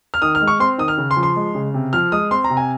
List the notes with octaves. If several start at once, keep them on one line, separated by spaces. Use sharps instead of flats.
F6
D#3 D#6
F6
G#3
C#6
C4 C6
D#3 D#6
F6
C#3
C6
F3
C6
G#3
C#3
C3
F3 F6
G#3 D#6
C4 C6
A#5
C3
G#5